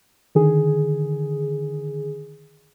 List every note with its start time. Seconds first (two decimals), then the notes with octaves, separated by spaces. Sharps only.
0.35 D3 D#3 G#4